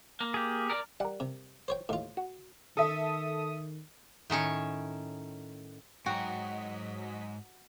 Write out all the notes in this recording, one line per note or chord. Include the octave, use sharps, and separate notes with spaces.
A#3
G4 G#4
A#4 D5
G3 A#4 F#5
C3
C5 C#5 G5
D#2 A2 F4
F#4
D#3 A4 E5 D#6
A2 D#3 C#4 C#5
G#2 F#3 F#4 D#5 G5 A#5 B6